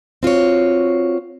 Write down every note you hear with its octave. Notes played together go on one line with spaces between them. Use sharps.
C4 F4 F#4 C#5